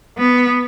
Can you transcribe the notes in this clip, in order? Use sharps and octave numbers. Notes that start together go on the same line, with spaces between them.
B3